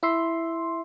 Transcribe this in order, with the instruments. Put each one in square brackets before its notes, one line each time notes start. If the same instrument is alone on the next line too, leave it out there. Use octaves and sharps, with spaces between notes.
[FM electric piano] E4 E5 C6